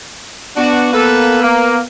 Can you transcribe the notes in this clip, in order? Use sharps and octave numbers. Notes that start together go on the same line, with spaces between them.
B3 D4 F#4
A#3 A4 B4
A#3